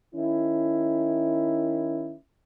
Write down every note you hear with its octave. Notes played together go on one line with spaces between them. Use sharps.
D#3 C#4 E4